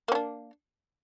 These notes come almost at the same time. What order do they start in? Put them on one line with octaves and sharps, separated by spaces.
A#3 C#4 D4